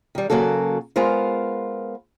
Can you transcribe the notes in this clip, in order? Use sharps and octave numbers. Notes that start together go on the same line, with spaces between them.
D#3 G3
C#3 F#3 A#3 F#4 A4
G#3 B3 F4 A#4 C5